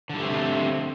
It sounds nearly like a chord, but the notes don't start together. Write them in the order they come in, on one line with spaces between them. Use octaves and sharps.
D3 G3 A3 C4